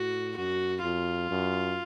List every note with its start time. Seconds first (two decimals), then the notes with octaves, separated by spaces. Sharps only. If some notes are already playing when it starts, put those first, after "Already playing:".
Already playing: A2 F#4
0.37 F#2 F#4
0.83 F2 F4
1.30 F#2